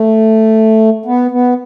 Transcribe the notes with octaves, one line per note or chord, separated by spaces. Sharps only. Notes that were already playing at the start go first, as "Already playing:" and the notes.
Already playing: A3
B3
B3